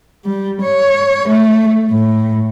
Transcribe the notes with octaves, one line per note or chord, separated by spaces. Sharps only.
G3
C#5
A3
A2